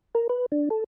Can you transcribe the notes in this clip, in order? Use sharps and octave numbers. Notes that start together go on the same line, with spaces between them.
A#4
B4
D4
A4